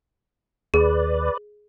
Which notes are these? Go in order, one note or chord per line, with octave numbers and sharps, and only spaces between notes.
D#2 G#4 B4 D5